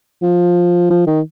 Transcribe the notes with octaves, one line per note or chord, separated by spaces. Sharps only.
F3
F3
D#3